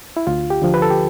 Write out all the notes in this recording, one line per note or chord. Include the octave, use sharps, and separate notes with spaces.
E4
D2 F4
G4
D3 F3
B4
A4
G4